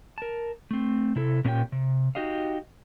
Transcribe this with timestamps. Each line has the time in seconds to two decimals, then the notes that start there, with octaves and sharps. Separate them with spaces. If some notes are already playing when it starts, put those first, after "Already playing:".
0.18 A#4 A5
0.71 A3 C4
1.16 C3 E4 A4
1.45 A#2 B3 C#4 D4 G4 G5
1.72 C3
2.15 D#4 F#4 G4 D#5 F5